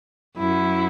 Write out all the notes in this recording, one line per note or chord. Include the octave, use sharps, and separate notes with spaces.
F#2 E4